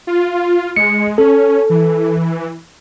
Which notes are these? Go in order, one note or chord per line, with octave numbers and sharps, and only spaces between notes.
F4
G#3 C#7
C#4 A4
E3